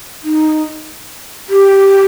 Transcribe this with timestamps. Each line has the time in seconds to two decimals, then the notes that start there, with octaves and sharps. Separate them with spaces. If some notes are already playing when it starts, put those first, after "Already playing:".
0.24 D#4
1.49 G4